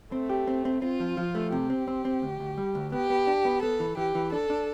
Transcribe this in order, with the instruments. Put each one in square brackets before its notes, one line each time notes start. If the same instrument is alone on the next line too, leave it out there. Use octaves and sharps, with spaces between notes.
[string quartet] A3 [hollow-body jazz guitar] C4
[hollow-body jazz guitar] G4
C4
C4
[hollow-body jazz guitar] C4 [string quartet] F4
[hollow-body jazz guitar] F3
F3
A3
[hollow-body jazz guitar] C3 [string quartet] G4
[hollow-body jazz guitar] C4
C4
C4
D2
D2
G3
D2
[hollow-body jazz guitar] B3 [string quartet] G4
[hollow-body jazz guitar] B3
D4
B3
[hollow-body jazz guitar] B3 [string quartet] A4
[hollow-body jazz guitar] E3
[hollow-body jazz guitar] E3 [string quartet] G4
[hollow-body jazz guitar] E3
[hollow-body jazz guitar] D4 [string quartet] A4
[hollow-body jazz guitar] D4